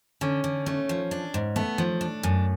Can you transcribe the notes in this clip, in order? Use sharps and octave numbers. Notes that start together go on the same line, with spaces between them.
D3 C#4
D3
A3 C#4
F3
D4
G#2
A3 B3
F3
D4
F#2